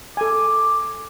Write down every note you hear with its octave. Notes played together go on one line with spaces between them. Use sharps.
A4 G#5 D6